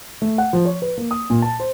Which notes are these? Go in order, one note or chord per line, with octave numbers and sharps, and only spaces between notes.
A3
F#5
F3
C#5
B4
A#3
D#6
A#2
A5
C5